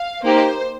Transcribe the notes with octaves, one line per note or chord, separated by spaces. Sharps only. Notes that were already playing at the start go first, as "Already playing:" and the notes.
Already playing: F5
A#3 D#4 G4 C5